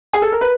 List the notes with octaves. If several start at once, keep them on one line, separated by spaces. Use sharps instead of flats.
G#4
A4
A#4
B4